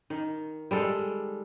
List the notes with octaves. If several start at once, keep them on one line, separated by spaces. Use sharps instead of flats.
D#3
G3 G#3 A4